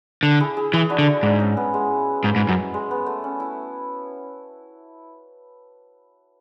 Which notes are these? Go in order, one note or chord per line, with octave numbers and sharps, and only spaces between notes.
D3
E4 G#4
E4 G#4
E3 E4 G#4
D4 F#4
D3
E4
G#2 D4
C#4
B3
G#3
G#2
G#2
F#2
G#3
B3
A3
C#4
E4